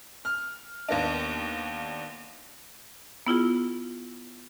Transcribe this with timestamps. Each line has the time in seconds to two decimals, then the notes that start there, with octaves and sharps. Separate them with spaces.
0.25 F6
0.89 D#2 A#3 B3 D4
3.27 B3 E4 F4 G#4